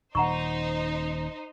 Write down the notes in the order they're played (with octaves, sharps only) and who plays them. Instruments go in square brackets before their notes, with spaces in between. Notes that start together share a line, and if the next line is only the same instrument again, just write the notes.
[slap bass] D#1 [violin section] D#4 C5 [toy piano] F#5 A#5 C#6